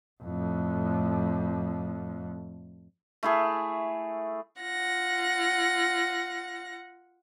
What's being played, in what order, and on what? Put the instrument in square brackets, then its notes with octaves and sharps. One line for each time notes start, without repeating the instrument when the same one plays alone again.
[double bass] F2 A2
[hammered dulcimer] A3 E4 G#4
[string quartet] F4 F#5 A#6